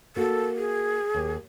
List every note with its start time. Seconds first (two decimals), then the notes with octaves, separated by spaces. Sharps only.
0.16 A#3 F#4 A4
0.57 G#4
1.14 D#2